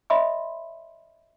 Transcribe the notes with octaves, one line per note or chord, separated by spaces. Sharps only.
C#5 D#5 E5 B5 C6 D#6